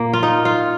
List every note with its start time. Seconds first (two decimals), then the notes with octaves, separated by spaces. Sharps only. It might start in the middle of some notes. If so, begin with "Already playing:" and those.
Already playing: A#2 A#3
0.13 F4
0.23 D#4
0.45 F4